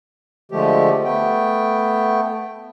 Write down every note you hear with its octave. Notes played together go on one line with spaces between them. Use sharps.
D3 F3 G#3 A3 G4
A3 B3 G5